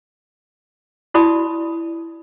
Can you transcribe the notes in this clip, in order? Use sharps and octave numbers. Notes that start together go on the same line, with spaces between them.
E4 F#4 D5 A5 B5 D#6